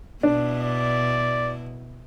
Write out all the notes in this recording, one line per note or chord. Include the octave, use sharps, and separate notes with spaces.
B2 D4 E4
D5